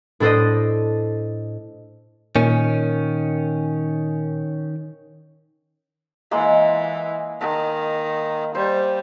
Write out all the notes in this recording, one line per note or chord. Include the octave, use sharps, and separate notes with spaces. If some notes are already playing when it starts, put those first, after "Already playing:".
A2 D4 A4 C5 D#5
A#2 D#3 C#4
E3 G#3 A#3
D#3
G3 C5